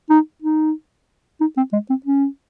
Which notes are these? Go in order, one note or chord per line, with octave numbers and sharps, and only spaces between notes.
D#4
D#4
D#4
C4
G#3
C4
C#4